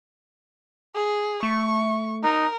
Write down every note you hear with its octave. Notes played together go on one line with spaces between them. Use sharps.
G#4
A3 C#6
D#4 A#4